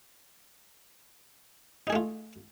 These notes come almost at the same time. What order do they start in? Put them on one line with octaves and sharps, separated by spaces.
D#4 G#4 A3 F4